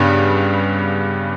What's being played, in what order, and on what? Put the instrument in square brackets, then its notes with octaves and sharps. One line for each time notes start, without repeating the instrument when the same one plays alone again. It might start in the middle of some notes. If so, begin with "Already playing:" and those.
Already playing: [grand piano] G2 [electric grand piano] C#3 G3 B3